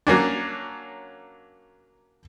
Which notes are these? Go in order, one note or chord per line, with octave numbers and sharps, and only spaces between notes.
F#3 A#3 C#4 D4